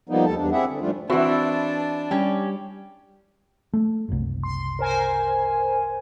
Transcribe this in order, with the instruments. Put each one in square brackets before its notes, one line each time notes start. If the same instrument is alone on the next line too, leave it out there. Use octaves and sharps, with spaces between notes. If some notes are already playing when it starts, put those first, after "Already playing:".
[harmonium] F3 G3 A#3 B3 D#4
D#2 G3 A4 A5
E2 G2 D4
C4 E4 G4 G#4 E5 F#5
D3
G#2 F3 G3 A3 D4 F4
[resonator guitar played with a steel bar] E3 E4 [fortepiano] C4 F#4 [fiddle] D4 A5 [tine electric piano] B4
[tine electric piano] G3 [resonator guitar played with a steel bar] C#4 G4
[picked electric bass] A3
F#1 C2
[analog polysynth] C6
A#4 C5 G#5